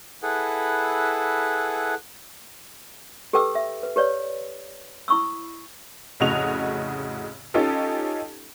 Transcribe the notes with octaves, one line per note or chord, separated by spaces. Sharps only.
E4 G#4 A4 B4 F#5
G4 A4 B4 G5 D6 E6
E5
B4
G4 B4 C#5 D5
E4 B5 C#6 D#6 E6
F1 A2 C#3 F#4 D#5 F7
C#4 D#4 F4 G4 A4